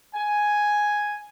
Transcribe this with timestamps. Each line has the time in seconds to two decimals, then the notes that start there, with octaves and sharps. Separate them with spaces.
0.15 G#5